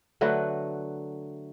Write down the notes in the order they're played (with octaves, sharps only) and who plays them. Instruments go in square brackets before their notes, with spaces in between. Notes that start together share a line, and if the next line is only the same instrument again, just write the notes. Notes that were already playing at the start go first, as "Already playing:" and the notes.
[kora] D3 F#3 A3 B4